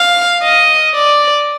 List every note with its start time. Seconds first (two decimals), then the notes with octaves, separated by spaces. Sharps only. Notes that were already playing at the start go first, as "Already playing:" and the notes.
Already playing: F5
0.43 D#5
0.95 D5